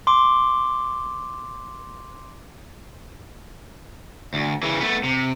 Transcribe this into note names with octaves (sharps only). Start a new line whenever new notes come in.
C6 D6
D2
C#3 E3
A3 B3
C3